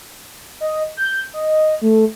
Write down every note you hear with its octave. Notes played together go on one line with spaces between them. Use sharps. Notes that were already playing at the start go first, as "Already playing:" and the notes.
D#5
G6
D#5
A3